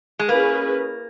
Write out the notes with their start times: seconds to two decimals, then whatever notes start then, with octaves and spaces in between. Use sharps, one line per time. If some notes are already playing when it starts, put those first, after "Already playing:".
0.19 G#3
0.28 A#3 C#4 E4 G#4 B4